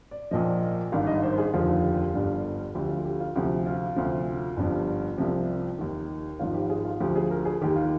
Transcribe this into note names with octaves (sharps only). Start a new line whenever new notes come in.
D5
A#1 A#2 F3 D#5
G#1 G2 D#3 F5
D#5
C5
G#4
F1 D#2 D3 F3 F4
G1 G2 D3 F3
D2 D3 F3 G4
F4
G4
F4
D2 C3 F3 G4
F4
D2 C3 F3
G1 G2 F3
C2 C3 F3 G4
D#2 D#3
G#1 G#2 F3 F4
G4
G#4
F4
D2 D3 F3 G4
G#4
A#4
G#4
D#2 D#3 G4
F4